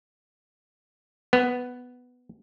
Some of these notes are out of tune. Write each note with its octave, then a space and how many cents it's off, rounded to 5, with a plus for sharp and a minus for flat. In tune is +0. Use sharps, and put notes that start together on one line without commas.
B3 +5